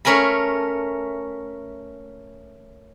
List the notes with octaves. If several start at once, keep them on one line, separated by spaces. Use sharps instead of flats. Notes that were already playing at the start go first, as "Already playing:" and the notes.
A3 C#4 A#4 G#5 B5